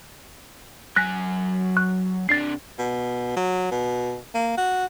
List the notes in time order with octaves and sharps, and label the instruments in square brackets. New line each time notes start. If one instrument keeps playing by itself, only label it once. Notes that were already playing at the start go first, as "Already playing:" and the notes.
[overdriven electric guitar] F#3 G#5 [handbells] F#6 A#6 B6
[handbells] C#6 F#6
[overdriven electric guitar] C3 D4 [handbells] A6 C7
[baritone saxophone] B2
F#3
B2
A#3
F#4